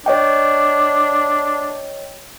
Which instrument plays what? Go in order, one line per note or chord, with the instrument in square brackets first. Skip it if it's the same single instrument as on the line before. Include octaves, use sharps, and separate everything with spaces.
[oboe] D4 [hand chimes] C#5 D#5 G5